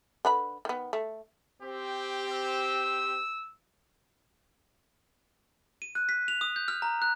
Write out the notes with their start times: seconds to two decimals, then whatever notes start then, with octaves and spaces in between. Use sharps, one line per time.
0.25 D3 B4 B5
0.65 D#3 B3
0.93 A3
1.62 C4 G4
2.32 E6
5.82 D#7
5.95 F#6
6.09 B6
6.28 F7
6.41 D#6
6.56 G6
6.68 F6
6.82 A#5
7.02 F#6